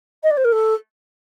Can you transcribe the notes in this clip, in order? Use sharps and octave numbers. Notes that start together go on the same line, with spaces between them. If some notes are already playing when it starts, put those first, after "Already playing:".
D#5
D5
C5
A#4
A4